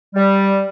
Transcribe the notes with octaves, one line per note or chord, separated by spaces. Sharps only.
G3